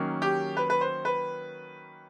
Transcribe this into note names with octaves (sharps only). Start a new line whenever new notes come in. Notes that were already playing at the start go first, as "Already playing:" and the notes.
Already playing: D#3 F#3 A#3 C#4
G4
B4
B4
C5
B4